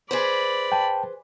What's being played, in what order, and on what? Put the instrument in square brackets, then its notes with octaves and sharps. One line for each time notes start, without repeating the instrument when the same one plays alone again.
[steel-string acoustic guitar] G#4 B4 C5 [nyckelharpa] D5 B5
[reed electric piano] G5 A5